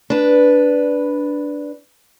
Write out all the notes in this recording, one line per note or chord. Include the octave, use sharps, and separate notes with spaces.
D4 B4